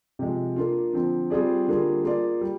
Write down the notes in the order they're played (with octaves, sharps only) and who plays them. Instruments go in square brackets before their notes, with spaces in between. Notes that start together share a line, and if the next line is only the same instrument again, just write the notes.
[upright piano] C3 F3 G#3
A#3 D4 F4
D3 F3 C4
G3 C4 F4 G#4 D5
D3 G3 A#3 F4 G#4
A#3 F4 G#4 D5
G3